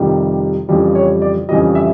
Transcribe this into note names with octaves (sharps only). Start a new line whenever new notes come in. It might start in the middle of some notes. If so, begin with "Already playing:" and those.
Already playing: F2 C3 D#3 G3
F2 C#3 E3 G3
C#5
D5
F2 C#3 E3 G3 D#5
E5